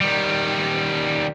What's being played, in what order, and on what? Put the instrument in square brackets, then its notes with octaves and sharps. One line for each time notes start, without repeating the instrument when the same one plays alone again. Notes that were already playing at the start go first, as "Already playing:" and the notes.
[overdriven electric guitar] D#3 G3